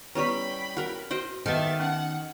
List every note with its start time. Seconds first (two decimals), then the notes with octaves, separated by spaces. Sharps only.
0.15 G3 B3 C#4 E4 G5 B5 C#6
0.77 F#4 A#4 F#5
1.11 F#4 C5 D#5 G5
1.46 D#3 B3 G4 A4 E5 A6
1.80 C#4 D#4 F#5